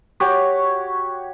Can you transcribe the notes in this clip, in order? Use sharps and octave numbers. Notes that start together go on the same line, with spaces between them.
F#4 G4 C#5